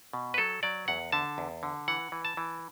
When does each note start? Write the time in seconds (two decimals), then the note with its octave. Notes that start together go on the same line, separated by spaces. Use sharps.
0.13 B2
0.34 B4
0.38 F#3 A4
0.63 F#3 D5
0.88 E2 F#5
1.12 D3 A5
1.38 E2
1.63 D3
1.88 E3 F#5
2.12 E3
2.25 A5
2.37 E3